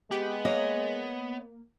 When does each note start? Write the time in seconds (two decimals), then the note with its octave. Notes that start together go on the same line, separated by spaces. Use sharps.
0.11 G#3 B3 G4
0.45 A#3 C#5 D#5